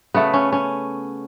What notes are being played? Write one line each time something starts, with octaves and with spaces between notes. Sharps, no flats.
C#3 A3 B3
C#4
C#4